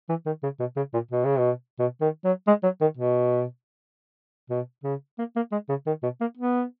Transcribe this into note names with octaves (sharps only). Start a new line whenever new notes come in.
E3
D#3
C#3
B2
C#3
A#2
B2
C#3
B2
B2
D#3
F#3
G#3
F#3
D#3
B2
B2
C#3
A#3
A#3
G#3
C#3
D#3
B2
A#3
B3